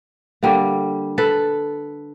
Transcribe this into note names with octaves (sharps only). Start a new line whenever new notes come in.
D3 G3 A#3
A4 B4